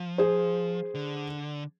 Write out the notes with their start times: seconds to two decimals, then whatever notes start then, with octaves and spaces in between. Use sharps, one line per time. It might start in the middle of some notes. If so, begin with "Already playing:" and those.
Already playing: F3
0.18 G#4 C5
0.95 D3